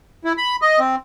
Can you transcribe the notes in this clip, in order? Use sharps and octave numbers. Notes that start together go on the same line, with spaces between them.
E4
B5
D#5
C4